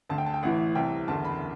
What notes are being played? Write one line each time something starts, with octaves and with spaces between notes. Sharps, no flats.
D2 D3 A5
G5
A5
G5
A1 A2 E3 F#5
C2 C3 E3 G5
F#1 E2 D3 A5
B5